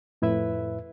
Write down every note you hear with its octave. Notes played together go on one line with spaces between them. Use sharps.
F2 A2 E4 B4 E5